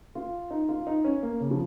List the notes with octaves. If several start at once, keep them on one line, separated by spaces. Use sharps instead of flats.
F4
D#4
F4
D#4
C#4
A#3
C#3
F3